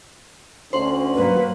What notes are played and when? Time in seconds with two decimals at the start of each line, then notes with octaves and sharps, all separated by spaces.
0.73 D2 C#4 C5 C6 F#7
1.14 G2 F#3 A#3 B4